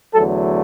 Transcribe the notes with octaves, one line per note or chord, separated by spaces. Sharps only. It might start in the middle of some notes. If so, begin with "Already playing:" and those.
E2 D3 F#3 A3 A4